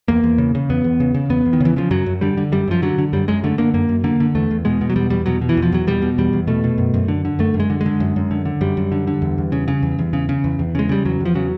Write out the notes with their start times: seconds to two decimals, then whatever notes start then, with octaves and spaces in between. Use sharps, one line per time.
0.08 E2 A#3
0.23 E2
0.38 C#3
0.55 C#3
0.69 E2 B3
0.84 E2
1.00 C#3
1.14 C#3
1.30 E2 B3
1.46 E2
1.53 D#3
1.60 C#3 E3
1.76 C#3 F3
1.91 F#2 F#3
2.06 F#2
2.21 D3 G3
2.37 D3
2.52 F#2 G3
2.68 F#2 F3
2.82 D3 F#3
2.98 D3
3.13 F#2 G3
3.28 F#2 G#3
3.44 D3 A3
3.58 D3 A#3
3.74 F#2 A#3
3.89 F#2
4.04 D3 A#3
4.20 D3
4.35 E2 A3
4.51 E2
4.65 B2 G#3
4.81 B2
4.90 F#3
4.96 E2 G3
5.10 E2 G3
5.26 B2 F#3
5.41 B2
5.49 E3
5.57 E2
5.62 F3
5.72 E2 F#3
5.87 B2 G3
6.02 B2
6.18 E2 G3
6.33 E2
6.47 B2 A3
6.64 B2
6.78 F#2
6.94 F#2
7.08 D3
7.25 D3
7.39 F#2 A3
7.54 F#2
7.60 G#3
7.70 D3
7.81 G#3
7.86 D3
8.00 F#2
8.16 F#2
8.31 D3
8.45 D3
8.61 F#2 G3
8.77 F#2
8.92 D3
9.07 D3
9.22 E2
9.38 E2
9.52 C#3
9.68 C#3
9.82 E2
9.99 E2
10.13 C#3
10.29 C#3
10.44 E2
10.59 E2
10.75 C#3 G#3
10.89 C#3 G3
11.05 E2 F#3
11.20 E2
11.25 F3
11.35 C#3 F#3